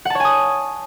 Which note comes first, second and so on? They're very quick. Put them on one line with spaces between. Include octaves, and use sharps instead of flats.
F#5 A5 C#5 G#5 D#6